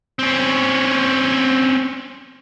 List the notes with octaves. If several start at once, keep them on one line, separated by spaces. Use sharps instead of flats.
C4 C#4